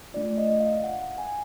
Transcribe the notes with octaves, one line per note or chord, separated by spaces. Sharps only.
A3 D4 F4 D5
D#5
F5
F#5
G#5